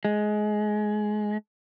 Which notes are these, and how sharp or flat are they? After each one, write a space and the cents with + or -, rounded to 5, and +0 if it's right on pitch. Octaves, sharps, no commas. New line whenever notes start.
G#3 +20